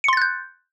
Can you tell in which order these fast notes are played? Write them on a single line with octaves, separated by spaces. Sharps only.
C#7 C6 A6 F#6 G6